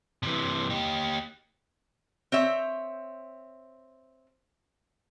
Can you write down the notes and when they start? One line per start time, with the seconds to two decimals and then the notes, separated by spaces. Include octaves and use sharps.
0.23 C3 E3
0.70 D#4 G4
2.32 C4 C#5 E5